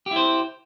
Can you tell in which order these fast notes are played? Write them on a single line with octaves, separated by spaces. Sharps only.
G4 E4 C5